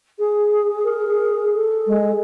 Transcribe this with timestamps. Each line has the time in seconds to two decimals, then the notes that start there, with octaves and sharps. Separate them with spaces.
0.19 G#4
0.84 A#4
1.06 G#4
1.55 A4
1.87 G#3